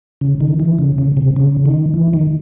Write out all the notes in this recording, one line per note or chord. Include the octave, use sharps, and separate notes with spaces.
C#3
D#3
E3
C#3
C#3
C3
C#3
D#3
E3
D#3